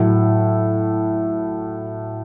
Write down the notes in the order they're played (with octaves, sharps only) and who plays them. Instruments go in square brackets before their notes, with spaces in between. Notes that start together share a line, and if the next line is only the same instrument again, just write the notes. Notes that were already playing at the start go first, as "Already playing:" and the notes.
Already playing: [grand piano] A2 F#3